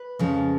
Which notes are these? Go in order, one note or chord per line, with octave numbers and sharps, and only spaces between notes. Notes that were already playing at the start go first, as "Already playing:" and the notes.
Already playing: B4
F2 C#3 F3 G#3